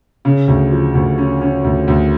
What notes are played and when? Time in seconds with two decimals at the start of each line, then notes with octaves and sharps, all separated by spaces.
0.25 C#3
0.48 D2
0.72 F3
0.95 D2
1.18 C#4
1.41 C#4
1.64 D2
1.88 D2